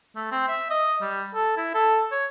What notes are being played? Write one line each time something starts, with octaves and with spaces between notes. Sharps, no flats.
A3
C4
E5
D#5
G3
A4
E4
A4
C#5